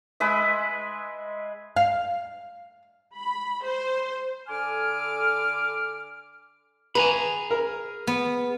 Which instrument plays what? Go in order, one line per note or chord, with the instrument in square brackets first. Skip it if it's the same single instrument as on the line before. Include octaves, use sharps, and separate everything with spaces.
[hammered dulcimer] G#3 B4 E5
[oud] F5
[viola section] B5
C5
[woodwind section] D3 A4 G#5 D6 F6
[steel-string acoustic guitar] G#4 [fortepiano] B4 [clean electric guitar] G#5 A#5 B5
[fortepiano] A#4
[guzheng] B3